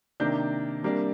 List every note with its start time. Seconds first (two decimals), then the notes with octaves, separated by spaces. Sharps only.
0.20 C3 D#3 A#3 D4 G6
0.83 C3 G3 A#3 D4